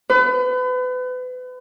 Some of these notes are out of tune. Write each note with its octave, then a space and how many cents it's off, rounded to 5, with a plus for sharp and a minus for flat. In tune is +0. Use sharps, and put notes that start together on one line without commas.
B4 +35